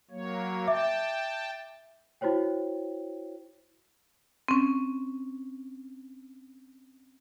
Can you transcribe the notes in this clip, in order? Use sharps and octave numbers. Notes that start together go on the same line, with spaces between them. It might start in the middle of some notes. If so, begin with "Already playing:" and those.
F#3 A#3 C#5
E5 G5 A5 D6
E4 F#4 C5 C#5 G5
C4 C#4